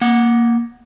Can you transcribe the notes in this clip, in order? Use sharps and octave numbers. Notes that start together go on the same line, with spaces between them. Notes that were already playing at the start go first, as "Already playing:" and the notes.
A#3 F#5